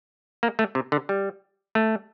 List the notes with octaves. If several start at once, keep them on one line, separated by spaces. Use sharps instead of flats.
A#3
A3
C3
D3
G3
A3